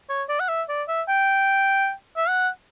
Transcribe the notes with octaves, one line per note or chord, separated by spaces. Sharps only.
C#5
D5
F#5
E5
D5
E5
G5
E5
F#5